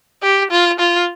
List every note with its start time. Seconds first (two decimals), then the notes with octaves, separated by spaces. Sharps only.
0.23 G4
0.51 F4
0.80 F4